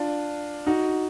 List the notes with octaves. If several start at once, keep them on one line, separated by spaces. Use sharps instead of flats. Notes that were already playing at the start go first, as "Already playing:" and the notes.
Already playing: D4 F4
D#4 F#4